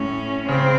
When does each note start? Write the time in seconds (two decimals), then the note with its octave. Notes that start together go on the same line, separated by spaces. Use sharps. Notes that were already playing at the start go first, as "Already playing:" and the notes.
Already playing: A2 C#4
0.49 C#3 C4